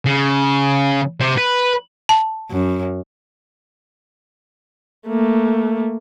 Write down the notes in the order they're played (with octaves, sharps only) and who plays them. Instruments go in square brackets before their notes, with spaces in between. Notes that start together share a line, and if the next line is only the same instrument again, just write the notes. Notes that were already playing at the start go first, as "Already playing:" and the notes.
[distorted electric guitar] C#3
C3
B4
[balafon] A5
[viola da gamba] F#2
[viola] A3 A#3